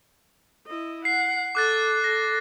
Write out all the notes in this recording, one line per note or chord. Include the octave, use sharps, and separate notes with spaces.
E4 D#5
F#5 C7
A4 D6 F#6 A6
A4 A#6